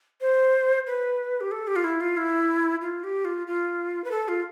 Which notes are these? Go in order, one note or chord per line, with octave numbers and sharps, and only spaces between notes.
C5
B4
G4
A4
G4
F4
E4
F4
E4
F4
G4
F4
F4
B4
A4
F4